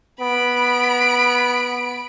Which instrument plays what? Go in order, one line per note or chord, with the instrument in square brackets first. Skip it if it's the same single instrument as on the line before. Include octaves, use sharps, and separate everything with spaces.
[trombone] B3 [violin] B5 D7